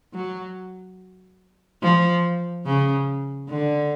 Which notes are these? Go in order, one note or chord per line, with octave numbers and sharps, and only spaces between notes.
F#3
F3
C#3
D3